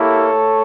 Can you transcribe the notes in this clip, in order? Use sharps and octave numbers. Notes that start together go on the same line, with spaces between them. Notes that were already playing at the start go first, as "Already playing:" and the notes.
Already playing: A#3 E4 G4 A4 C#5
A3